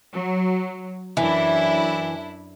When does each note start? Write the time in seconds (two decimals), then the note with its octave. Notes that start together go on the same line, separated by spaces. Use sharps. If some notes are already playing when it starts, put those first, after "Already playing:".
0.13 F#3
1.17 F#2 E3 D4 E4